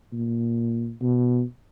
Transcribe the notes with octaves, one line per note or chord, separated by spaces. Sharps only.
A#2
B2